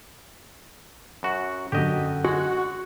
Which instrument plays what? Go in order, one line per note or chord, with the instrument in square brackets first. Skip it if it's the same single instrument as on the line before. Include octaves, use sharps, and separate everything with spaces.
[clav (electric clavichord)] F#2 F#4
[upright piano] F#2 D3 [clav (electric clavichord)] G4 D#5
[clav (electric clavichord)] G#3 [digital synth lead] F#4